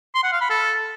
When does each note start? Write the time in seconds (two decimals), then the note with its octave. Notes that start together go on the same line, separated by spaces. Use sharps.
0.15 C6
0.24 F#5
0.32 F5
0.41 B5
0.50 A4